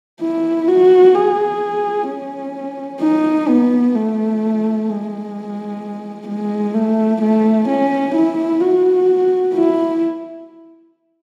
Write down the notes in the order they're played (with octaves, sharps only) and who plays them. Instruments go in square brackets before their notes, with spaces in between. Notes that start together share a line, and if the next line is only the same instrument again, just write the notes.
[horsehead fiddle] E4
F#4
G#4
C#4
D#4
B3
A3
G#3
G#3
A3
A3
C#4
E4
F#4
E4